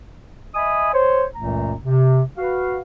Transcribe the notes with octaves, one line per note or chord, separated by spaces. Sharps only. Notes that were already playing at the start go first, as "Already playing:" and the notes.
D#5 E5 G#5 B5 D#6
C5 C#5
C#2 F#2 A#2 E3 A3 A#5
C3
F#4 B4 F5